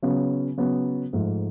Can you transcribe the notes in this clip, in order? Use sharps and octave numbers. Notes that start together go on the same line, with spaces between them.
C#3 F#3 B3
C#3 F#3 B3
G#2 F3 A3